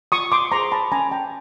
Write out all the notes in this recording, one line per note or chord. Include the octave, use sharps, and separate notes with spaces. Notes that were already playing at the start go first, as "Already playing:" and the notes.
F4 C#6 D#6
C6 D6
G#4 C5 A#5 C6
A5 B5
C#4 G#5 A#5
G5 A5